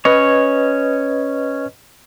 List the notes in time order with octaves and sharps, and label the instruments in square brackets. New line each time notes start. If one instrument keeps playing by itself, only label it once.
[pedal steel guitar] C#4 C#5 [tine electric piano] B4 D#5